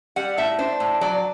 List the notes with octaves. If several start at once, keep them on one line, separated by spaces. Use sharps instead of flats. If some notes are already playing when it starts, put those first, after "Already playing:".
G3 F#5
A2 E5
D4 C5
A2
F#3 D5